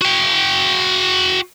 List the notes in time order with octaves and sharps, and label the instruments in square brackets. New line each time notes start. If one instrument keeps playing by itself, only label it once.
[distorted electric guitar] F#4 G5